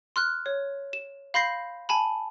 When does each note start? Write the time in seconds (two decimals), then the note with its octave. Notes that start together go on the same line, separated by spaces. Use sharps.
0.16 C6 F6 F#6
0.46 C#5
0.93 E7
1.34 F5 B5 C6 G6 A#6 C7
1.89 G#5 A5 B5